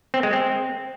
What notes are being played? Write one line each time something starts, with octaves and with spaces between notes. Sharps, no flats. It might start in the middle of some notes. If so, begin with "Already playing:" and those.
C4
G#3
C4